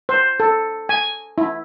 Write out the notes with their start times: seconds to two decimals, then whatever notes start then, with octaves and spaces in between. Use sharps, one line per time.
0.09 C5
0.40 A4
0.89 G#5
1.38 E4